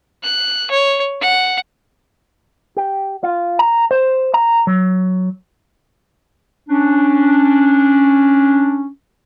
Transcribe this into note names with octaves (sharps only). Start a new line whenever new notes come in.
F#6
C#5
F#5
G4
F4
A#5
C5
A#5
F#3
C#4 D4